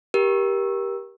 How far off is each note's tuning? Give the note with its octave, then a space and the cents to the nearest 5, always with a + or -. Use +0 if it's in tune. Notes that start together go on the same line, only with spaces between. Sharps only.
G4 +0 A#4 +25